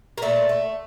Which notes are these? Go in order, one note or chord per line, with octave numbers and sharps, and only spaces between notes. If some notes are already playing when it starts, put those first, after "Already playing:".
A#4
A#2 A3 A4
A3